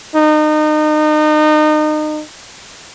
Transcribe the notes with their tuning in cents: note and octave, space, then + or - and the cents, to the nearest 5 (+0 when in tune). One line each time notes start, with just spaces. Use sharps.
D#4 -30